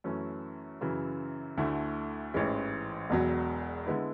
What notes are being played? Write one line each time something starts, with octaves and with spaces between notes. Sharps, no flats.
F#2 E3 A3 C#4
F#2 C#3 E3
D2 D3 A3 E4
A1 G#2 E3 G#3 C#4
E1 E2 B2 F#3
D3 G#3 B3 E4